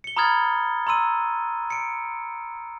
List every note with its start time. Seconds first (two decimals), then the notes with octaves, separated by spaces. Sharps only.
0.04 C#7 G7
0.16 A#5 B5 D#6 F6 G#6 A6
0.87 A#5 C6 E6 D#7
1.70 C#7 D7